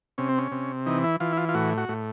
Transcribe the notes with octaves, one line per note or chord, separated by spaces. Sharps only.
C3 C#4
C4
C#4
C3
E3 D#4
E4
E3 F4
E4
F4
F4
A2 F#4
F#4
A2